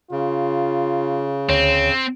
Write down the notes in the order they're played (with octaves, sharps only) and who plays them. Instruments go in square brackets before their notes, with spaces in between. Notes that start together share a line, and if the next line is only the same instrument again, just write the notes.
[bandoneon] C#3 [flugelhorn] F4
[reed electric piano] D2 C#5 [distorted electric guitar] C4